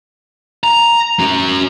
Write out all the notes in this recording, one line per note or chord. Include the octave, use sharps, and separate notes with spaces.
A#5
C#4 F#4